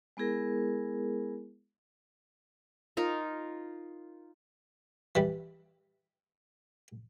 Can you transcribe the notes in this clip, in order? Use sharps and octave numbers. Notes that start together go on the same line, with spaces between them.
G#3 B3 E4 G#4 A#4
D#4 F4 A#4
E3 G3